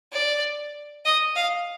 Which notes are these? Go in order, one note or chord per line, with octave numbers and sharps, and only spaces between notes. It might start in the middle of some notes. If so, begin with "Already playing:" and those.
D5
D#5
F5